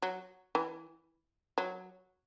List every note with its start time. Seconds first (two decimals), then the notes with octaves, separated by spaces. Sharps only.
0.02 F#3
0.55 E3
1.58 F#3